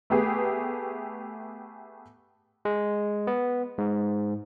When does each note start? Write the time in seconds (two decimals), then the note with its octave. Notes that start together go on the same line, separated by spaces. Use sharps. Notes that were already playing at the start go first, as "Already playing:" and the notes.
0.10 A3 B3 G4 G#4
2.65 G#3
3.27 B3
3.78 G#2